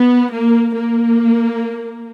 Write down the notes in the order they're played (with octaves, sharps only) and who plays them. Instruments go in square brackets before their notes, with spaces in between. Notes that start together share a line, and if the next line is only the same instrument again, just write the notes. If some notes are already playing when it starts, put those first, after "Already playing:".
Already playing: [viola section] B3
A#3
A#3